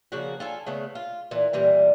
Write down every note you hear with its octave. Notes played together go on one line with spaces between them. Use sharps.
C#3 F3 A#3 F#4
F4 A4 G#5
C#3 A3 B3
F4
A#2 E3
A#2 E3 G3 A#4